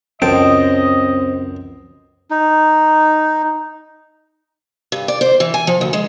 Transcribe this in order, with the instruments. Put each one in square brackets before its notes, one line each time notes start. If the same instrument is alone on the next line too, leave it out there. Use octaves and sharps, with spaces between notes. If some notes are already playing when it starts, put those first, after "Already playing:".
[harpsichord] C#2 F#2 A5 [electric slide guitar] C4 C5 G5 [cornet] D#5
[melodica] D#4
[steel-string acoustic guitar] G2
D5
C5
E3
G#5
F3
D2
G#3